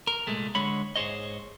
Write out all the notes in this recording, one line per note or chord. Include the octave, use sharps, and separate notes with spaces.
A#4
C2 A#2 G#3 A3
D3 G#3 C#5 B5
G#2 G#4 C5 C#5 D#5